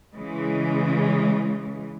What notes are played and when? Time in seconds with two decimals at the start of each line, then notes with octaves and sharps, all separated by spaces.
0.15 C#3 E3 G#3